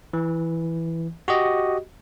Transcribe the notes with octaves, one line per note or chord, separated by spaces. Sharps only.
E3
F#4 G4 D#5